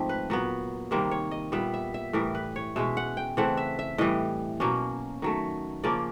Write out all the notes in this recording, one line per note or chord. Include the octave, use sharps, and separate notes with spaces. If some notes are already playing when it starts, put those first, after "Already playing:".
Already playing: G#2 F3 A3 C4
B4
A#2 F#3 B3
C3 D#3 G3 A#3 C5
C#5
D#5
A#2 G3 B3 E5
E5
E5
A2 E3 G3 A#4
B4
C#5
B2 G#3 C#4 E5
F#5
G5
C#3 E3 A3 C4 F#5
E5
E5
A2 E3 G3 D#5
B2 F#3 A#3 C#4
D#3 F#3 A3
C#3 F3 A#3 C#4 D5